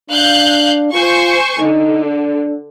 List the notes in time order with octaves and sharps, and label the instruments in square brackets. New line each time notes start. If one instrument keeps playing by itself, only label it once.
[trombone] D4 [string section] F5 F#6 G6
[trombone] F4 [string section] C5 G#5 C#6
[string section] D3 [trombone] D#4
[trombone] D4